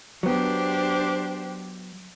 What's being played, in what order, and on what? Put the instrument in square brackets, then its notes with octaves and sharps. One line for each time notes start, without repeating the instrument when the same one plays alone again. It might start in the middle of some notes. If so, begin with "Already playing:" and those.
[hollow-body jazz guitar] F#3 B3 [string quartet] D4 G4 C5